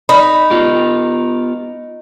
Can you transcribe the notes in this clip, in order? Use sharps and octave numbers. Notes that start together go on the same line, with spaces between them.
D#4 B5
B3 F4 G4